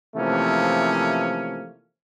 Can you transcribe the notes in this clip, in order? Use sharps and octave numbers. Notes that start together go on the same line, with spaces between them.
C3 E3 F3 A3 A#3 C#4